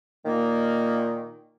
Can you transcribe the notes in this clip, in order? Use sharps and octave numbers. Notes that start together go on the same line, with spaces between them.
A#2 D#3 A#3